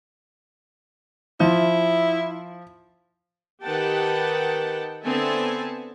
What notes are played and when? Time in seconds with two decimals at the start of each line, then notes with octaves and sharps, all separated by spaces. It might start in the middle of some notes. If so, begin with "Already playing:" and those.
1.40 F3 E4
3.63 D#3 G4 B4 F#5 G5 A5
5.04 D3 B3 C4 E5 G#5 A5